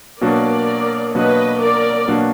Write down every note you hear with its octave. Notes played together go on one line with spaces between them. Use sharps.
B2 F#3 A#3 D4 F#4 A#4 D5
B2 F#3 A#3 D4 F#4 B4 D#5
A#4 D5
B2 F#3 A#3 D4 F#4